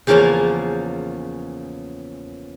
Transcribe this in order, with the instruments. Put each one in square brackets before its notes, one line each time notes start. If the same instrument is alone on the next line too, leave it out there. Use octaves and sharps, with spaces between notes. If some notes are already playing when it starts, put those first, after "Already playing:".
[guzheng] E2 C#3 F3 A#3 C#4 A5